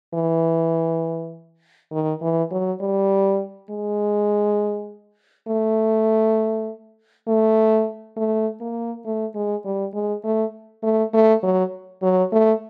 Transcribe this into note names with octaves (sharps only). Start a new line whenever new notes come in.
E3
D#3
E3
F#3
G3
G#3
A3
A3
A3
A#3
A3
G#3
G3
G#3
A3
A3
A3
F#3
F#3
A3